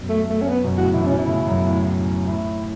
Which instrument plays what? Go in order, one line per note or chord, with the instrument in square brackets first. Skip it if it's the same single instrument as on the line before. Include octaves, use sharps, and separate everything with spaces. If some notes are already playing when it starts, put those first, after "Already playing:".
Already playing: [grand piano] F#2 B2
[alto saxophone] A3
A3
C#4
B3
[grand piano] F#2 B2
[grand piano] A2 C#3 [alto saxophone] F#4
[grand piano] B2 E3 [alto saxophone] E4
[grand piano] B2 E3 [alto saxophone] C#4
[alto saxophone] E4
[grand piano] A2 C#3
F#2 B2
A2
[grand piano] A2 [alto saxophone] E4